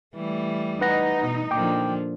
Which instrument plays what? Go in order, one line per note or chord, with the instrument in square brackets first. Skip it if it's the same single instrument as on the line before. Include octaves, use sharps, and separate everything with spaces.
[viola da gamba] E3 G3 A3
[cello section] D#4 [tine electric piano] B4 F#5 A#6
[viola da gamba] B2
[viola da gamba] A#2 D3 F3 [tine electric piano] G5 D6